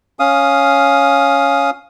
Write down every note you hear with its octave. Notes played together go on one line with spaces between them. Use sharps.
C#4 F5 D#6